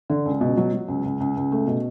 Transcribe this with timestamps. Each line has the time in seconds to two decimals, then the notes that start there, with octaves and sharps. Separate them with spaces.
0.10 D3
0.26 C#2
0.41 B2
0.57 F#3
0.73 F#3
0.88 C#2
1.05 C#2
1.20 C#2
1.37 C#2
1.52 A3
1.67 B2